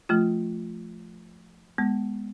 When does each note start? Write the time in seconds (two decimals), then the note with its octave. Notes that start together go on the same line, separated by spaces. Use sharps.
0.09 F3 A3 F4
1.78 G#3 B3